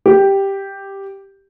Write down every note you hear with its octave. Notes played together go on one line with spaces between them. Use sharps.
G4